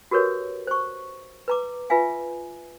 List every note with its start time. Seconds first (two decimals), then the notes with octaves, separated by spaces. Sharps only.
0.11 F#4 G4 A#4 B4 C#5
0.67 C5 C#6
1.48 B4 A#5 D6
1.90 F4 B4 E5 F5 G#5